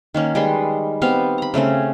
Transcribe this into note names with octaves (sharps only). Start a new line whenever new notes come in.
D#3 A#3 C#4
G3 G#3 B4 C6
B3 C4 G4 F5
A#5 B5
C#3 A3 C4 C#4